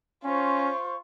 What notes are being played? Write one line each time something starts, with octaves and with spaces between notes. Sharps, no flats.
C#4 F4 C5 C#6